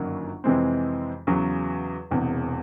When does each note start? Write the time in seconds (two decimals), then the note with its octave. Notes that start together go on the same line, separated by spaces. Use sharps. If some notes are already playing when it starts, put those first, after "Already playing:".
Already playing: G1 F#2 D#3 F#3 A#3
0.44 F2 C3 E3 G#3 C4
1.27 E2 C#3 F#3
2.11 E1 E2 C3